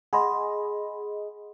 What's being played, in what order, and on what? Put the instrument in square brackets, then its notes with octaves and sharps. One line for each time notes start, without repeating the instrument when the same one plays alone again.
[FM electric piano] G#4 D#5 [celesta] F#5 B5 C6